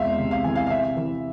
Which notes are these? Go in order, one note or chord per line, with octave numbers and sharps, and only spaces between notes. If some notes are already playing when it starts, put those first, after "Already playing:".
Already playing: E2 C3 G#3 E5 F5 C6
C3
F5
E3 G#5
F5
F5
C3 E5
E3